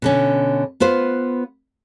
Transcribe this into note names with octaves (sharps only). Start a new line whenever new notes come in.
B2 D3 C#4
B3 F4 B4 C5